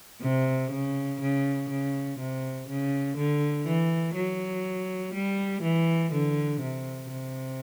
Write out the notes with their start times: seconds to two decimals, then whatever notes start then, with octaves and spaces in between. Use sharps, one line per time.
0.21 C3
0.71 C#3
1.20 C#3
1.69 C#3
2.18 C3
2.68 C#3
3.17 D3
3.67 E3
4.15 F#3
5.14 G3
5.62 E3
6.12 D3
6.61 C3
7.10 C3